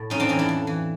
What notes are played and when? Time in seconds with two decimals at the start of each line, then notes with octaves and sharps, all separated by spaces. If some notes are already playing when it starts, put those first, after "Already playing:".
Already playing: A2
0.10 F2 C#4 D#4
0.20 C4 D4
0.29 E3 C#4 D#4
0.39 D4 E4
0.49 F2
0.67 E3